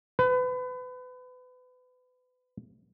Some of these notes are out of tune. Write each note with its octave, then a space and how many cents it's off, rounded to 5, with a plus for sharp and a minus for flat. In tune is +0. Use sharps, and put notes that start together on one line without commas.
B4 +30